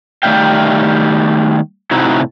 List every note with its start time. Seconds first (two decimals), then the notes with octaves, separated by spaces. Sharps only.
0.23 D#3 G3 A3 E5 F5 G5
1.91 A2 C3 D#4 E4 F#4